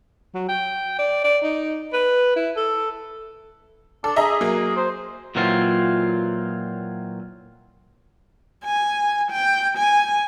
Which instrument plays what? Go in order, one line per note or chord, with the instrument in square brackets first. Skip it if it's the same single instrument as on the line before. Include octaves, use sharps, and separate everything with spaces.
[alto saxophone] F#3
G5
D5
D5
D#4
B4
E4
A4
[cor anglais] D4 [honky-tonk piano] A4
[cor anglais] G#4 [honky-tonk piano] D#5 E5 A#5
[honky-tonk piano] F#3 A#3
[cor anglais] C5
[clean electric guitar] A#2 E3 F#3 C4 F4
[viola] G#5
G5
G#5